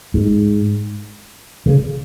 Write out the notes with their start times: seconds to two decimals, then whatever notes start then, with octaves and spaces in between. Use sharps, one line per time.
0.14 G#2
1.66 C#3